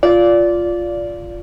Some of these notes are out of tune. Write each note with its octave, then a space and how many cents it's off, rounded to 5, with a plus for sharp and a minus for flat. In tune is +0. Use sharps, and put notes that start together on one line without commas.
F4 +0 D5 -15